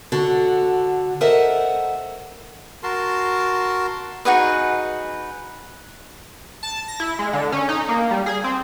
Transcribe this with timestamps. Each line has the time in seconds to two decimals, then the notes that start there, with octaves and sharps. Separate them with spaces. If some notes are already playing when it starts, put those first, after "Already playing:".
0.12 D3 F#4 A4
1.21 A4 A#4 C5 D#5 E5 F#5
2.83 F#4 A#4 A5 C6
4.25 D#4 F#4 G#4 B4
6.63 A5
6.88 A#6
7.00 E4
7.19 G#3
7.33 D3
7.52 C#4
7.69 D#4
7.89 A#3
8.11 G3
8.26 G#4
8.44 C4